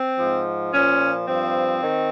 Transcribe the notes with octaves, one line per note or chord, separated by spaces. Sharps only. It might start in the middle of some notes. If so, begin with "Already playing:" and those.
Already playing: C4
G#2 F3
A#2 F3 C#4
G2 F3 C4
D#3